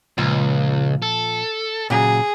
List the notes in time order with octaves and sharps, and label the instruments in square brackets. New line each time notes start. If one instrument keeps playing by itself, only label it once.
[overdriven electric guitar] C#2 [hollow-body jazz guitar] A#2 F3 F4
[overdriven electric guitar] A4
[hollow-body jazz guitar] A#2 C#3 F#3 [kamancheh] G#4